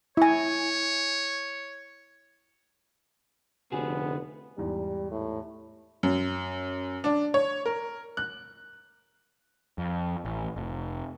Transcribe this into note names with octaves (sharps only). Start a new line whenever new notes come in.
E4 C#5 G#5
F1 D3 B3 F#4 G#4 G#5
E2 G#2 G3
A2
F#2
D4
C#5
A#4
F#6
F2
A1
F1